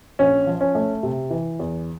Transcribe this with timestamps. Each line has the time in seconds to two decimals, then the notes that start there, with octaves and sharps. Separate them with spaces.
0.19 A#1 C#4
0.47 F3
0.61 C#4
0.75 A3
1.03 C3
1.30 E3
1.59 E2